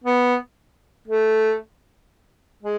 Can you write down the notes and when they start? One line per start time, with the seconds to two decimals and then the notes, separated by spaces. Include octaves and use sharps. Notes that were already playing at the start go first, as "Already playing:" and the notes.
0.04 B3
1.08 A3
2.63 G#3